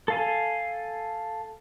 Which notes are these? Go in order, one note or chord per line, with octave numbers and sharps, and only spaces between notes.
A4 F5 G#5